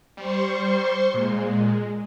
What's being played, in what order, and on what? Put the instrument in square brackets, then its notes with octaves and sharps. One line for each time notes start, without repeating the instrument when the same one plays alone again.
[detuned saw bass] G3 [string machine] C5 C6 C#6
[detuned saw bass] A#2 [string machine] G#3